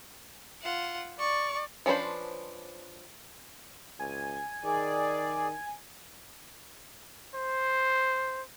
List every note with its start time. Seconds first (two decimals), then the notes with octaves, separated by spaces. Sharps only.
0.63 F4 F#5
1.19 D5 C#6
1.86 F3 C#4 D4 B4 C5
4.00 C#2 G#5
4.64 D#3 G#4 D5
7.35 C5